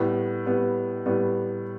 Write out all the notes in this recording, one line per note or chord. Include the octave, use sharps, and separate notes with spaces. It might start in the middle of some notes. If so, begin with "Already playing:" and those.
Already playing: A2 G3 B3
A2 G3 B3
A2 G3 B3